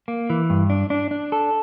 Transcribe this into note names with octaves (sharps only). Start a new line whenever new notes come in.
A#3
E3
G2
D4
D4
D4
A4